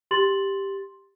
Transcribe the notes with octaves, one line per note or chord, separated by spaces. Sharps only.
G4 C6 A6 F#7